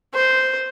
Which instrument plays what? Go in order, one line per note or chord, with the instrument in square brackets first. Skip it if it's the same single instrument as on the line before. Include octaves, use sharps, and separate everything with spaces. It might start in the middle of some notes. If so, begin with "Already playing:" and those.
[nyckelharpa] C5